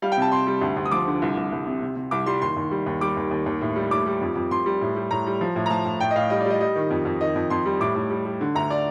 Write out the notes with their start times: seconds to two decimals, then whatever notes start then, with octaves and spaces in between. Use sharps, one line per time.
0.02 G3 F5
0.12 G5
0.17 C3 A5
0.32 C3 C6
0.47 G3
0.61 D2
0.76 D2
0.85 D#6
0.91 F3 D6
1.07 D3
1.22 C2
1.37 C2
1.52 C2
1.67 C3
1.82 C3
1.96 C3
2.11 C2 D6
2.26 G3 C6
2.42 D#2 C6
2.57 D#2
2.71 G3
2.86 D#2
3.01 G3 D6
3.17 D#2
3.31 D#2
3.46 D#2
3.61 A2
3.76 G3
3.91 A2 D6
4.06 G3
4.21 F2
4.35 F2
4.51 F2 C6
4.66 G3
4.81 A2
4.96 G3
5.11 A2 A#5
5.26 G3
5.41 F3
5.56 A2
5.66 A#5
5.70 F3 A5
5.85 A2
6.00 A2 G5
6.11 D#5
6.15 A2 F5
6.30 G3 D#5
6.40 D5
6.46 G3 D#5
6.60 G3 D#5
6.76 D#3
6.90 F2
7.05 F2
7.21 D#3 D#5
7.36 F2
7.50 F2 C6
7.65 G3
7.80 A2 D6
7.95 A2
8.10 G3
8.26 G3
8.41 D3
8.55 D2 A#5
8.70 D5